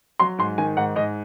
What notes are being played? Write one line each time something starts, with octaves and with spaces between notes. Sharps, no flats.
F#3 C6
G#2 C6
D#3 G#5
G#2 F#5
G#2 D#5